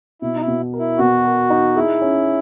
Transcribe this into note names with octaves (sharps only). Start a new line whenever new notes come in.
B2 E4
D#4
E4
B2
A#4
E4
B2 F#4
A#4
D#4
E4 G#4
C#4